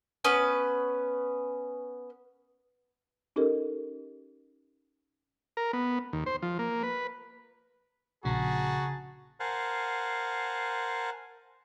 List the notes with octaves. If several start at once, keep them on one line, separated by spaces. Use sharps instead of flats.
B3 C#4 B4
C#4 D#4 G4 A4 A#4 D#5
A#4
B3
D#2
C5
F3
A#3
B4
A#1 C#3 F#4 G#4 A5 A#5
A#4 C5 F5 F#5 G#5 A5